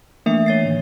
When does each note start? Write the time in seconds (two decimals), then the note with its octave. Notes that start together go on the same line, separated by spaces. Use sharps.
0.26 E3 A3 A#3 D4 E5 C#7
0.46 C#5 A6 C7
0.63 A2 D#3 E3